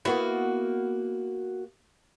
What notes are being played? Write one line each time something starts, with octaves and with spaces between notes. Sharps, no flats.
A#3 B3 E4 F#4